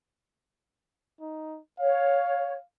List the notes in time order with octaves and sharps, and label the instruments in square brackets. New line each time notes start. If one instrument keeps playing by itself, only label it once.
[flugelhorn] D#4
[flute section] C#5 [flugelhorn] F5